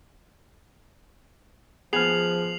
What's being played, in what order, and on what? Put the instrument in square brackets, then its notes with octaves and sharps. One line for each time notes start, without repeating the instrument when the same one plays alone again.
[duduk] F3 [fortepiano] B3 G#5 [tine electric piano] G#4 F6 [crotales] C7 F7 F#7